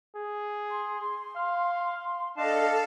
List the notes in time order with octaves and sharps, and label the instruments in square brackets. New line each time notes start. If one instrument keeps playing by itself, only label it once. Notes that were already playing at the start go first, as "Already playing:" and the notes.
[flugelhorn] G#4
[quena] C6
[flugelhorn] F5
[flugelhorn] D4 [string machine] A4 [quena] D#5 [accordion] F5 A5